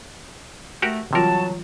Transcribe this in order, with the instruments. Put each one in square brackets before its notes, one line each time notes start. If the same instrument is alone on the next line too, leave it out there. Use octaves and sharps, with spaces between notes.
[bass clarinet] A3 [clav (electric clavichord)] F#4 G4 A#4
[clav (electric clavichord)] C3 A#4 [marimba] E3 G3 F4 [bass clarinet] F#3 [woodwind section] F#4 A5